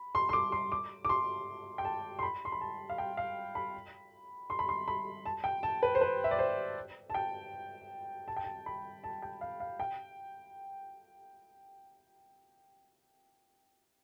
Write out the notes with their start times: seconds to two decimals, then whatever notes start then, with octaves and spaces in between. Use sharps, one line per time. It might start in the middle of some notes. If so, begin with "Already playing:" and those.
Already playing: B5
0.15 C6
0.29 C6
0.33 D6
0.52 C6
0.72 D6
1.05 D6
1.09 C6
1.78 G5
1.85 A5
2.19 C6
2.23 B5
2.45 C6
2.52 B5
2.61 A5
2.90 F5
2.98 G5
3.17 F5
3.55 B5
4.50 C6
4.59 B5
4.69 C6
4.88 B5
5.26 A5
5.44 G5
5.63 A5
5.83 B4
5.95 C5
6.01 B4
6.24 E5
6.31 D5
6.39 C5
7.10 A5
7.14 G5
8.28 A5
8.37 G5
8.44 A5
8.66 B5
9.04 A5
9.22 G5
9.41 F5
9.60 F5
9.80 G5